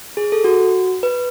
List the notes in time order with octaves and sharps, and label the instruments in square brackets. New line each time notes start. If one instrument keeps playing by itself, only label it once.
[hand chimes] G#4
A4
F#4
B4